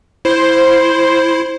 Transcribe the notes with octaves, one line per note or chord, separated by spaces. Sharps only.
E4 C5